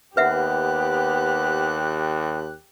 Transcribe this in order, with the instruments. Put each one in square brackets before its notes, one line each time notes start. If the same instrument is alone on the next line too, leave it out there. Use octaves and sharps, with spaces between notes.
[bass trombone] D#2 [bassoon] B3 [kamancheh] G4 F#6 [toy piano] B4 E5 F#5